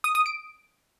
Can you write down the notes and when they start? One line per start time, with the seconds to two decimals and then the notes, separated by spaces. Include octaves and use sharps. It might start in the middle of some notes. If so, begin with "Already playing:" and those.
0.04 D#6
0.15 D#6
0.26 D7